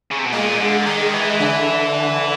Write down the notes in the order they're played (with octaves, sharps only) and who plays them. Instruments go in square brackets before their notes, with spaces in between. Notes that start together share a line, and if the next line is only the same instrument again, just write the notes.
[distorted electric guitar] C#3
C3
B2
[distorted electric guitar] A#2 [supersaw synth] G#3
[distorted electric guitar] D3
[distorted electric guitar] D#3 [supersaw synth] G#3
[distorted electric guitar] E3
[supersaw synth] D3